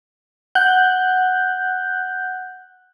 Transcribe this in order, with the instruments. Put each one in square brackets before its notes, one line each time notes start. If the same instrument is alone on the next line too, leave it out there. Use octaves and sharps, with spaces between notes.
[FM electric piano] F#5 F#6 G6